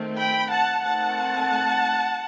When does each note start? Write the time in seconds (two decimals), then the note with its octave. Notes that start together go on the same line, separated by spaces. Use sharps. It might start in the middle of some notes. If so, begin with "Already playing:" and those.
Already playing: D#3 A3 C4
0.17 G5 B5
0.50 F#5 A5
0.83 D#3 A3 C4 F#5 A5